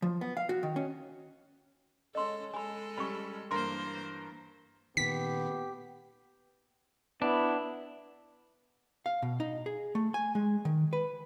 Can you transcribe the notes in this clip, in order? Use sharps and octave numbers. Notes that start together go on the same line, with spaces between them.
F3
B3
F5
F#4
D#3
C#4
G#3 C#4 A4 D#5 C6
G#3 A4 G#5 B5
G3 C#4 B5 C#6
G2 E3 A#3 A#4 C5 C6
A#2 D#3 B3 G4 B6
B3 D4 E4
F5
B2
D#4
G#4
A3
G#5
G#3
D#3
B4